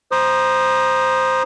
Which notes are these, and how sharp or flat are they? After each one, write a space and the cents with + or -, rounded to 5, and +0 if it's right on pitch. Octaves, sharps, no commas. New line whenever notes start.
C5 +0 A#5 +20 D#6 -25